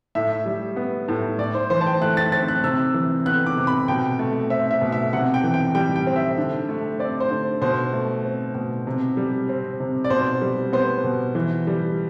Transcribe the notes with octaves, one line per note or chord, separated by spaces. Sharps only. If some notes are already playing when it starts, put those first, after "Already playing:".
A2 E5
G3
B3
A2
A2 D5
C5
E3 C5
A5
G5
A3 F#6
A6
C4 A6
F#6
C3 E6
E3
B3 F#6
D6
C3
B5
B2 G5
A3
C4 E5
E5
B2
E5
C3 F#5
G5
E3
G5
G3 G5
G5
C4
E5
D3
A3
C4 D5
C5
D3
B2 C5
A3
C4
B2
C3
G3
C4
C3
D5
B2 C5
G3
B3 C5
B2
E3
G3